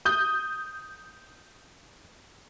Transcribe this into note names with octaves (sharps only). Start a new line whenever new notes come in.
D#6 G6